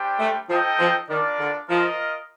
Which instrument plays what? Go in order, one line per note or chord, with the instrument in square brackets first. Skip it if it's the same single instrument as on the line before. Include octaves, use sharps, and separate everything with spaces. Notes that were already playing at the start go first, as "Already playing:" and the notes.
Already playing: [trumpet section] G3 D4 G4 C5 G5
[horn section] A3
[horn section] F3 [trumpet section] D#4 A4 D#5 G5
[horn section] F3
[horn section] D#3 [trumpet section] D4 F4 A#4 D5
[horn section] D3
[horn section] F3 [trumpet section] F4 A#4 D#5